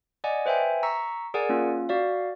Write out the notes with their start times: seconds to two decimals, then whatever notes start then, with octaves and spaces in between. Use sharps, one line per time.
0.24 D5 D#5 F#5 G#5
0.46 B4 C5 E5 G5 G#5
0.83 A#5 C#6 E6 B6 C#7
1.34 G#4 A#4 D5 F#5 G#5
1.49 A#3 C#4 F4
1.89 F#4 D5 F5